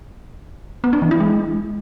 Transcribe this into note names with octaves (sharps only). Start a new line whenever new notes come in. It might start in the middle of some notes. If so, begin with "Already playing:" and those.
B3
D4
E3
E4
G#3